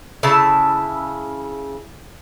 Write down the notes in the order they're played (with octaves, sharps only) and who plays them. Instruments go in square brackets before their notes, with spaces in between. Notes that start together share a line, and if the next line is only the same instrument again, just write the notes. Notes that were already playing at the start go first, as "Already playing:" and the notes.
[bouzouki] C#3 E4 A5